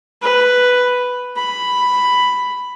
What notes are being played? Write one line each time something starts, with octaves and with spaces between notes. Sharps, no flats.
B4
B5